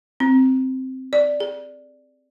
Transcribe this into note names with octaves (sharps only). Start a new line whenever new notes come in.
C4
D5
G#4